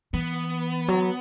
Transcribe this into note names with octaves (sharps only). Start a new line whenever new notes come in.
E3 B3
F#3